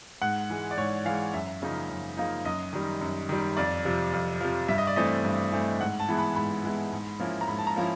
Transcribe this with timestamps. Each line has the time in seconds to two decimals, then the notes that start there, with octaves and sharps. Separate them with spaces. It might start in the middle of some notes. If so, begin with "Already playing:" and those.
0.22 G#2 F#5
0.50 E3 G#3
0.71 D5
0.77 G#2 C#5
1.05 E3 G#3 F5
1.33 F#2 E5
1.62 C#3 F3 A#3 D#4
1.89 F#2
2.17 C#3 F3 A#3 D#4
2.45 F#2 D#5
2.73 D#3 G3
3.01 F#2
3.29 D#3 G3
3.57 F2 D5
3.85 C3 F3
4.13 F2
4.41 C3 F3
4.68 G2 E5
4.78 D#5
4.87 D5
4.96 E3 A3 C4 D#5
5.25 G2
5.52 E3 A3 C4
5.80 G#2 F#5
6.00 A5
6.09 E3 G#3 B3 E4
6.18 B5
6.36 G#2 B5
6.64 E3 G#3 B3 E4
6.92 G#2
7.20 F3 A#3 C#4 E4
7.41 A#5
7.48 G#2 B5
7.59 A5
7.67 A#5
7.76 F3 A#3 C#4 E4